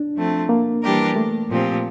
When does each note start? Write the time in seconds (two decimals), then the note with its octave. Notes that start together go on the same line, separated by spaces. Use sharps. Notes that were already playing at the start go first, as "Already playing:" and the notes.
Already playing: D4
0.16 F3 A3 C4
0.49 A#3
0.82 E3 G3 D4 G4 A#4
1.16 A3
1.50 A#2 F3 C4 G4